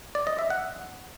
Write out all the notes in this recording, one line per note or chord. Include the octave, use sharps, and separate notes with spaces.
D5
D#5
E5
F#5